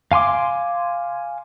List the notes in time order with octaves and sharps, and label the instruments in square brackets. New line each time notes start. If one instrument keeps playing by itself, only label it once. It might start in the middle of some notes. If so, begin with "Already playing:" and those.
[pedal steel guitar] F5 G#5 C6 D6